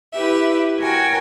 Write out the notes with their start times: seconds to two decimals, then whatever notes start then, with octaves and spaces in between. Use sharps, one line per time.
0.14 E4 G4 B4 E5
0.79 F#4 A#4 C#5 G5 G#5